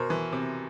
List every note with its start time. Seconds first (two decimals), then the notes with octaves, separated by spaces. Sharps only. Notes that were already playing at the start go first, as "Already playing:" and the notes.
Already playing: B2 A#4 C5
0.10 E3
0.32 C3